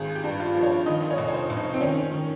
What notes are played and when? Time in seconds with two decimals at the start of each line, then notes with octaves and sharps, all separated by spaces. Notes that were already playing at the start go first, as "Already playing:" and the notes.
Already playing: G#1 G#4
0.15 G4
0.24 G2
0.40 F4
0.55 F3
0.63 C#5
0.86 D#3 D#5
1.02 D#5
1.10 C#5
1.18 F1
1.28 C#5
1.33 C5
1.50 F1
1.57 D#4
1.74 C4
1.81 D#3 C#4
2.12 D#3